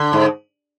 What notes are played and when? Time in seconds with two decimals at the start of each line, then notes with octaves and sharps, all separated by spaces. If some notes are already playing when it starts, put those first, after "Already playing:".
Already playing: D3
0.13 G#2